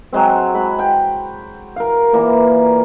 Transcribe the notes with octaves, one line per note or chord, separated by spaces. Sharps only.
F#3 G#3 C4
G#3 B5
G5
A#4 F5
A#2 E3 A#3